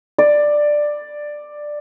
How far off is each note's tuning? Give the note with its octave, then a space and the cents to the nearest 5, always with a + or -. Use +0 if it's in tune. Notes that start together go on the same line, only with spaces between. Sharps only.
D5 +10